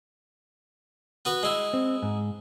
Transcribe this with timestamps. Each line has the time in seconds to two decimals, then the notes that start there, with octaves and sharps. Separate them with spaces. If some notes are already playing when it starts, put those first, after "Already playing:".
1.25 B3 F#4 B4
1.43 G#3 E4
1.73 C4
2.03 G#2